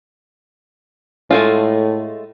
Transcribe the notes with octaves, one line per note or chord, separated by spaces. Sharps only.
A2 G#3 A3 F4